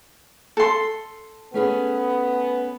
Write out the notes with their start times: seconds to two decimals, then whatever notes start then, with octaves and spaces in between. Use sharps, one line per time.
0.57 A4 C6
1.54 A3 B3 C#4 G#4